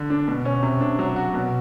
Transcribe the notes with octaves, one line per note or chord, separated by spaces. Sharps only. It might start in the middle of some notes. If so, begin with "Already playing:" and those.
Already playing: D3
D4
B2
C#4
C3
D4
F#3
F#4
B2